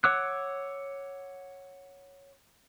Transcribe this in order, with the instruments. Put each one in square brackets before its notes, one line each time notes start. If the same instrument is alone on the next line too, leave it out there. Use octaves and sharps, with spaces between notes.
[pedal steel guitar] C#5 F#5 D6 E6 F#6